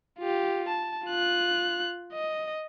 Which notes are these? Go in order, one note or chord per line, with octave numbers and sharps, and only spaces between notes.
F4 G4
A5
F4 F#6
D#5